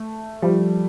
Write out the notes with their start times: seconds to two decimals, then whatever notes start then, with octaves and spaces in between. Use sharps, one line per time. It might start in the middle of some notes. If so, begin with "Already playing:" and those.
Already playing: A3
0.42 F3 G3